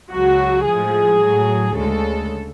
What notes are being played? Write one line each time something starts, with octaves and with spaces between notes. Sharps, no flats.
C#2 C#3 F#3 F#4
A2 F3 G#3 G#4
A2 F#3
D2 C#3 G#3 A4